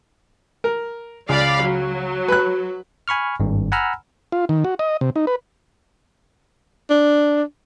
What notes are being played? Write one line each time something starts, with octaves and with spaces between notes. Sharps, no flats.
A#4
C#2 D5 F5 B5
F#3
B4 F#6
G#5 B5 C#6 F6
G#1 G2
F#5 G#5 A#5 B5 E6 F6
F4
D#3
F#4
D#5
C3
D#4
B4
D4